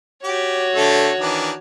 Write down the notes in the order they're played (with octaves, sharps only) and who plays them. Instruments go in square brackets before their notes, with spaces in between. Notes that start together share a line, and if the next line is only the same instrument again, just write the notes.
[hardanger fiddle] F#4 C#5 [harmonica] G4
[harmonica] D3 A3 A4
D#3 E3 D4